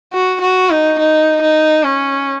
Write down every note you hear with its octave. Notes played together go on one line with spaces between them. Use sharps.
F#4
F#4
D#4
D#4
D#4
C#4